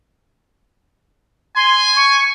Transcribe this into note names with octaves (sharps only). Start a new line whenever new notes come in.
G#5 C6
C#6